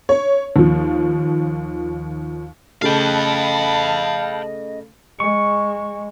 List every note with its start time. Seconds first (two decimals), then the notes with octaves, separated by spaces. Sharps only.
0.09 C#5
0.56 D#2 F3
2.82 C#3 A3 D#5 F5 G5 A5 B5
5.20 G#3 C#6